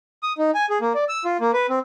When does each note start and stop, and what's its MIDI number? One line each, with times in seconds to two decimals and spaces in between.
0.23 0.33 87
0.38 0.51 63
0.54 0.66 80
0.70 0.79 68
0.81 0.93 58
0.94 1.04 74
1.09 1.24 88
1.25 1.37 65
1.41 1.51 58
1.53 1.67 71
1.69 1.79 60